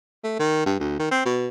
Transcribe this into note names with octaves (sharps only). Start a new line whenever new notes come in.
A3
D#3
G2
D2
D#3
C4
B2